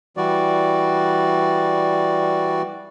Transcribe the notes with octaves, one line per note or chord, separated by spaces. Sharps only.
E3 G3 F#4 D5